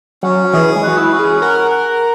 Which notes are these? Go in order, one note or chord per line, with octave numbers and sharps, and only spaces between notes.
F#3 C#4
E3 G#4
G#3
F#4 B4
E4
C#4 F#4
G#4
A#4 F#5
F#5